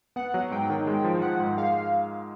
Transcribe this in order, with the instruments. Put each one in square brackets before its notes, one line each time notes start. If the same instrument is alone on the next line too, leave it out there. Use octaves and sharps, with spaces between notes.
[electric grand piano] B3 [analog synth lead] F#5
[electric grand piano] F#3
[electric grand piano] G#2 [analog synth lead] G5
[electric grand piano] D#3
[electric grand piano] G#3 [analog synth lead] G5
[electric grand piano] F3
[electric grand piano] F3 [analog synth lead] F#5
[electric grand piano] G#2
[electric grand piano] G#3 [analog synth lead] F5